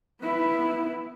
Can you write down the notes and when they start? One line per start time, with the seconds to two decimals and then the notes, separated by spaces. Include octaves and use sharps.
0.22 B3 E4